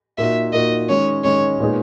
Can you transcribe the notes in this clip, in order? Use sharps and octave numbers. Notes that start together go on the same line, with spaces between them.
A#2 A#3 D#4 F#4 E5
A#2 A#3 D#4 F#4 D#5
D#3 G#3 C#4 C#5
D#3 G#3 C#4 C#5
A#2 G#3 B3 D#4 G#4